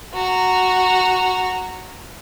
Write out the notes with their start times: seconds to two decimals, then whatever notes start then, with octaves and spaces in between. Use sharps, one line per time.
0.14 F#4 A#5